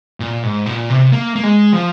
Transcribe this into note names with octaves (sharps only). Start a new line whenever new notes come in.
A#2
G#2
A#2
C3
A#3
A#3
G#3
F3